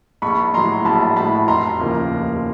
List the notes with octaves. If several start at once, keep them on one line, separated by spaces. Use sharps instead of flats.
A#1 B5 C#6
A2 F#3 A#5 C6
A#1 A5 B5
A2 F#3 A5 B5
F1 A#5 C6
D#2 C#3 F3 A#3
F1